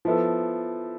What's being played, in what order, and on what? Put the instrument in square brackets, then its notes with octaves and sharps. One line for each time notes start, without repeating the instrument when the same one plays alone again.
[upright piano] F3 B3 E4 A4